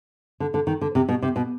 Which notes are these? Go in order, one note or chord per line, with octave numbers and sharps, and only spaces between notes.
D3
D3
D#3
D3
C3
B2
C3
B2